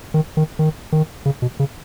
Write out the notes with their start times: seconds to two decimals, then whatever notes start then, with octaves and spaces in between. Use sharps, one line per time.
0.14 D#3
0.37 D#3
0.59 D#3
0.92 D#3
1.26 C#3
1.42 B2
1.60 C#3